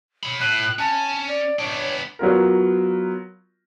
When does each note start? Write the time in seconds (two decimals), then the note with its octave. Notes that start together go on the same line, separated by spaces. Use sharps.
0.23 C#5 B5
0.40 A2 F#6
0.79 C#4 A5
1.28 D5
1.59 B3 D4 C#5
2.19 F#3 B3 F4 A#4